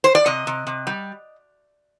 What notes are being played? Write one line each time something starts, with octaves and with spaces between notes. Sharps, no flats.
C5
D5
C3 D#5
C3
C3
G3